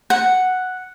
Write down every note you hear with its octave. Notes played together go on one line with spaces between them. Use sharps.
F#5